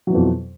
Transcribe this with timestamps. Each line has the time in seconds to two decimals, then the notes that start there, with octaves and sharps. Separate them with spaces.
0.07 F#3
0.10 E3
0.12 B2
0.15 F2